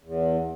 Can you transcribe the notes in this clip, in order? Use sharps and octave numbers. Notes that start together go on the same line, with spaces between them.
E2